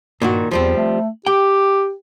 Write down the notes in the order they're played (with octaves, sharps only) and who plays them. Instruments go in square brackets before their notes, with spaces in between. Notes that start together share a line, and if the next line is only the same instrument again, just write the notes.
[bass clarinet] G2 [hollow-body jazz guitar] A#2 D#3 F#4
[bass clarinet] E2 [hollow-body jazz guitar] F3 G3 C4
[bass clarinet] A3
[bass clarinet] G4 [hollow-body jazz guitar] G5